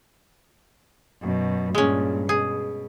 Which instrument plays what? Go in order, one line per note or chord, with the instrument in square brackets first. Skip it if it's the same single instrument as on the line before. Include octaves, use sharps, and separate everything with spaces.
[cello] F#2 B2
[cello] G2 A#2 [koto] G#3 C#4
[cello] B2 [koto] G#4